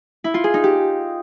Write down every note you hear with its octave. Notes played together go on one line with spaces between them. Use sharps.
E4
F4
G#4
D#4
G4